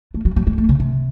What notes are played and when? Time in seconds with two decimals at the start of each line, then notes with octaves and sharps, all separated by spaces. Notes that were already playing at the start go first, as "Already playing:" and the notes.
0.14 A3
0.25 F#3
0.36 F#3
0.47 G#3
0.58 A3
0.69 C#3
0.80 C3